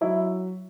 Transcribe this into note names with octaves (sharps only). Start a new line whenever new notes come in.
F#3 E4